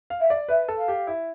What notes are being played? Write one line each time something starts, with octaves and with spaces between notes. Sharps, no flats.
F5
E5
D5
B4 E5
A4
F5
G4
E4